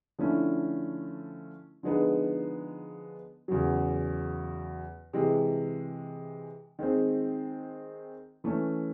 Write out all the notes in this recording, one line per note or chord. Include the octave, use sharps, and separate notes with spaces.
D3 F3 A3 C#4 E4
D3 F3 G#3 B3 D#4
E2 C#3 F#3
C3 E3 G#3
D#3 G#3 C4
E3 A3 C#4